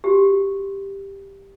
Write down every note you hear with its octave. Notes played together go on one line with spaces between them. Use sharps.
F#4 G4